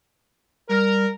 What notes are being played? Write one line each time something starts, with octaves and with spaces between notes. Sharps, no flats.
G3 A#4